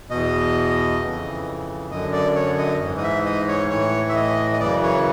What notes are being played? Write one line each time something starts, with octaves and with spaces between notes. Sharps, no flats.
E2 B2 D#5
F2 C#3 E3
F#2 D3 D#5
D5
C#5
D#5
G#2 E3
D#5
E5
D#5
C#5
A2 E3 C#5
E5
D#5
D#5
F#2 C#3 E3 D5
C#5